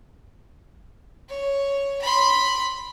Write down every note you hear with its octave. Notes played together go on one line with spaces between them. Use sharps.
C#5
B5 C6